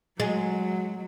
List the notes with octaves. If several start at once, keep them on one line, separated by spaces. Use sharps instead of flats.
F#3 G#3